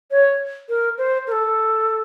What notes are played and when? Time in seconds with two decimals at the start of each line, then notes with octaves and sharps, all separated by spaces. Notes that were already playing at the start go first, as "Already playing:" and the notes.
0.11 C#5
0.69 A#4
0.98 C5
1.27 A#4
1.32 A4